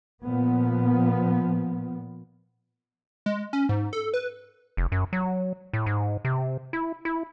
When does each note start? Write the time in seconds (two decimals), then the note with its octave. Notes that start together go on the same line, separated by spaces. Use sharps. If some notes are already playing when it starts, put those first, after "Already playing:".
0.22 A#2 F3 B3
3.26 G#3
3.53 C#4
3.69 G#2
3.93 A4
4.14 B4
4.77 F1
4.92 F#2
5.13 F#3
5.73 A2
5.86 G#2
6.25 C3
6.73 E4
7.05 E4